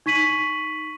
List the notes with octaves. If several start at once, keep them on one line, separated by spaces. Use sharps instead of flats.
D#4 C#6 B6 D#7 F#7